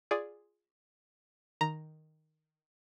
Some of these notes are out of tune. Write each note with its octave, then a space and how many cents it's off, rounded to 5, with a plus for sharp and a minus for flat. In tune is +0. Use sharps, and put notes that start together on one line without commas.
F4 +0 G#4 +0 D5 +0
D#3 +0 A#5 +0